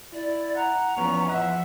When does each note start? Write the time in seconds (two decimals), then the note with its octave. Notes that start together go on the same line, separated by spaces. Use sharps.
0.13 E4 D5
0.56 F#5 A#5
0.97 E2 F3 B3 C#4
1.29 F3 E5 F#5